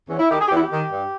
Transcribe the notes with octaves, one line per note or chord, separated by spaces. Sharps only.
E2 C#4
E4
D#3 G4
G#4
G4
E2 E4
G4
D#3
G2